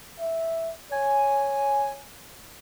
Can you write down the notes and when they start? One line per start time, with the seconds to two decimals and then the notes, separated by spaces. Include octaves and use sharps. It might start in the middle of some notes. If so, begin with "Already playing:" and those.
0.20 E5
0.92 C#5 G#5